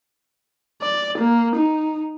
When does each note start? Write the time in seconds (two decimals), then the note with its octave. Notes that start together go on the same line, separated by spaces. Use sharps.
0.82 D5
1.18 A#3
1.56 D#4